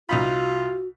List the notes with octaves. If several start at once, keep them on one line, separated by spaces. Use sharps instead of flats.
C2 D#4 F4 F#4 B5